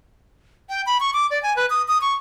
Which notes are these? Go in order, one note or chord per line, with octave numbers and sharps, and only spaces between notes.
G5
B5
C#6
D6
D5
G#5
B4
D#6
D#6
C#6